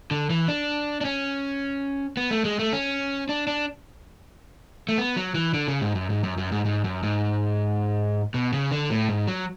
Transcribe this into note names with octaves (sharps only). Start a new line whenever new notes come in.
D3
E3
D4
D4
C#4
B3
A3
G#3
A3
C#4
D4
D4
A3
B3
F#3
E3
D3
C#3
G#2
F#2
G#2
F#2
F#2
G#2
G#2
F#2
G#2
B2
C#3
D3
A2
G#2
F#3